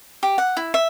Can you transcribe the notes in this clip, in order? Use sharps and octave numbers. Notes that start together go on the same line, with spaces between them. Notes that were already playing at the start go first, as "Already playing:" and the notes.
G4
F#5
E4
E5